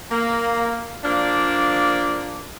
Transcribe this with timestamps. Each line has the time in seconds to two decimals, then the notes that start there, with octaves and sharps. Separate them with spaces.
0.11 A#3
1.04 F3 A#3 D4